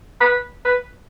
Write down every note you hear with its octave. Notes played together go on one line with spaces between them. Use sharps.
B4
B4